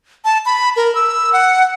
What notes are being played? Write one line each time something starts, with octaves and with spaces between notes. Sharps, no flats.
A5
B5
A#4
E6
F#5